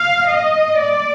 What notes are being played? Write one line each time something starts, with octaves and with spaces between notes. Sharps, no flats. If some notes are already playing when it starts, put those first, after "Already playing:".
Already playing: F5
D#5
D5